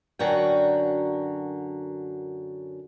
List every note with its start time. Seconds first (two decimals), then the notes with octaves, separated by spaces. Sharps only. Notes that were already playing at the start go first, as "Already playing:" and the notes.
0.19 F#2 D3 F#3 F#4 A#4 G5